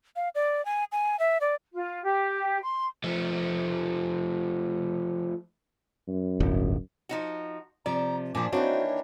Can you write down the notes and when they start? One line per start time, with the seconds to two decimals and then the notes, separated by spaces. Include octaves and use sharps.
0.16 F5
0.35 D5
0.65 G#5
0.92 G#5
1.19 E5
1.41 D5
1.72 F4
2.02 G4
2.61 C6
3.04 F3 A3
6.08 F#2
6.40 D1 G1
7.09 F3 D#4 F#4
7.86 C3 F3 D5 A#5
8.35 A#2 F3 D4 C5 G#5 D6
8.52 D#3 E3 A#3 C4 D4 F#4 C#5